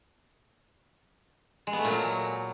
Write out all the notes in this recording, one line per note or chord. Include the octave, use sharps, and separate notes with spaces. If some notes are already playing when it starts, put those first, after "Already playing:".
G#3
B3
A3
A#2
F#3